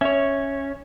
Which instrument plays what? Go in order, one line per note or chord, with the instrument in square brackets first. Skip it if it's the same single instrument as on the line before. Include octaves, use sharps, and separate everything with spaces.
[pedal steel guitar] C#4 [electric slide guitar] C#5 E5